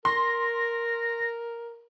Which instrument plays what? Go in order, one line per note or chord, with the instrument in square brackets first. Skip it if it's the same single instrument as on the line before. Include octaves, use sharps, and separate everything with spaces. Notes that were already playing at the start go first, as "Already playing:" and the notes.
[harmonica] A#4 [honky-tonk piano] C6 [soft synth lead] A#6